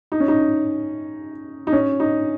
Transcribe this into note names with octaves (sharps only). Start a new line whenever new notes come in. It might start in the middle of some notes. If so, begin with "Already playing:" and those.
D#4
C#4
D#4
D#4
C#4
D#4